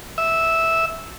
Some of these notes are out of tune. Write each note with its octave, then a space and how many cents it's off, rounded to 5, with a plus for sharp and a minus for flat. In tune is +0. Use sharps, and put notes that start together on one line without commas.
E5 -10